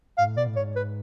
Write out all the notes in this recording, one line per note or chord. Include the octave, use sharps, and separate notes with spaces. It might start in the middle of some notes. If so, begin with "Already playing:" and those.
G#2 F5
A2
B2 D5
A2
G#2 C#5
B4